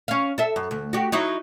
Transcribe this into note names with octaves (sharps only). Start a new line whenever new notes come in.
C#4 F5
A4 E5
F#2
D2
F#4 G4
F#3 D#4 E4